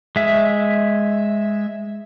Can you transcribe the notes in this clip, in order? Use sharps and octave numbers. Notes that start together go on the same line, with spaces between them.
G#3 E5